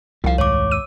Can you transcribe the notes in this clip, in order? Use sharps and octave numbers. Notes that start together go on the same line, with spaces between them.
C2 F3 G3 F5
D#2 G#2 C#5 D6
E6 D#7